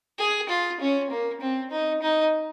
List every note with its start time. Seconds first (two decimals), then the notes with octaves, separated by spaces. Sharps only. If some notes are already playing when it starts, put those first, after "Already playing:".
0.19 G#4
0.49 F4
0.80 C#4
1.10 A#3
1.41 C4
1.71 D#4
2.02 D#4